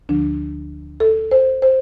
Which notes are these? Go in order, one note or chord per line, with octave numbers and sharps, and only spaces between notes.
D2 D3 F3 D4
A4
C5
C5